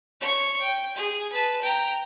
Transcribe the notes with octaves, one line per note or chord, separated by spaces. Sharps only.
C#5 C#6
G5
G#4
B4 A5
G5 A#5